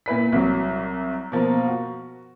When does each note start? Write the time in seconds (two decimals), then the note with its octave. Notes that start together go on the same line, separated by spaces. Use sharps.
0.06 A#2 E4 B4 B6
0.32 C2 F#3
1.32 B2 F3 A#3 A#5
1.67 F#4